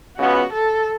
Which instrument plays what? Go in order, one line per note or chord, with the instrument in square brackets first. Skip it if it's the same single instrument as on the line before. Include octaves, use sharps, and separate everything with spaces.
[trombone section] C#2 C#3 G#3 B3 [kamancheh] F#4
[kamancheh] A4